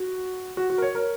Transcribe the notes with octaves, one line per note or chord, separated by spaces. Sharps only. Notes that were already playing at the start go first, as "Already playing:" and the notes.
Already playing: F#4
F#4
F#4
A#4
C#5
A#4